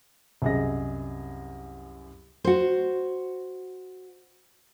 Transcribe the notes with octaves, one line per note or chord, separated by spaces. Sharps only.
C2 F#2 G#4 D#5 A#6
F#4 C5